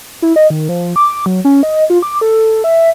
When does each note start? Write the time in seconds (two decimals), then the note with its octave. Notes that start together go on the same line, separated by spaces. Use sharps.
0.22 E4
0.36 D#5
0.50 D#3
0.69 F3
0.96 D6
1.26 F#3
1.45 C#4
1.63 D#5
1.90 F4
2.03 D6
2.21 A4
2.64 E5